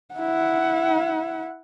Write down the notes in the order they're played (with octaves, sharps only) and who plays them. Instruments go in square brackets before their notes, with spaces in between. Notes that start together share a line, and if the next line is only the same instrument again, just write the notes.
[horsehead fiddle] E4 F#5